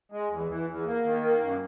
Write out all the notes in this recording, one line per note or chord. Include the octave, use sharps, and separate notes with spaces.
G#3
E2
E3
E2
A#3
D#3
A#3
F#2